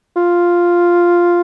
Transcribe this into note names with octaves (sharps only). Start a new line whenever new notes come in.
F4